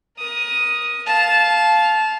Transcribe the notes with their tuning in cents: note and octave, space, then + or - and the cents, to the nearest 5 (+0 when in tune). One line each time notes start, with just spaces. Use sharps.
A#4 +25 D#6 +0
F5 +0 A5 -20